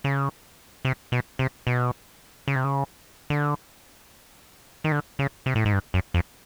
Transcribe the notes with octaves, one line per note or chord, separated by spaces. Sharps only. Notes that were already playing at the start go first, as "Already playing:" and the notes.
C#3
C3
B2
C3
B2
C#3
C3
C#3
D3
D#3
D3
C#3
C3
A2
G#2
G2
F#2
F2